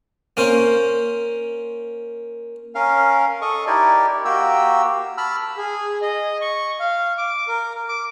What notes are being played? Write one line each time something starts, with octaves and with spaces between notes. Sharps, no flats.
A#3 C#4 C5
C#4 A#4 F5
A4 D#5 C#6
D#4 E4 G4 A#4 D5
A#3 F#4 G4 G5 E6
A5 B5 E6 F6
G#4
D#5
C#6
F5
D6
A#4
D6